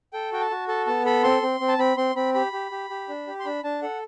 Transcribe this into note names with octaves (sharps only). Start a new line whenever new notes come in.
A4 G5
F#4 G5
A5
F#4
A4 A5
B3 A5
A4 B5
C4 C6
C4
C4
A5
C4 B5
C4 C6
C4 B5
G4 B5
G4
G4
G4
D4
G4
C6
D4 B5
D4 A5
A4 F#5